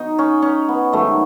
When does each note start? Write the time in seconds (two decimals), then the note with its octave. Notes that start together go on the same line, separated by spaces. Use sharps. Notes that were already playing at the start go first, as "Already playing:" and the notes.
Already playing: B2 F#3 D#4
0.19 C#4
0.42 C#4
0.69 B3
0.92 G#2 D#3 F#3 A3